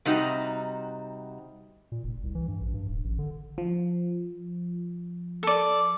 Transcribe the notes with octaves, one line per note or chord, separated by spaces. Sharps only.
C3 G3 D#4 F#4
A#2
F1
C2
E3
G2
A#1
G2
D1
A1
D3
F3
A4 D5